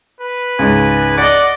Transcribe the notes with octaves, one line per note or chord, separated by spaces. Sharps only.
B4
C#2 G#2 G#5
D5 D#5 F#5 D6 A6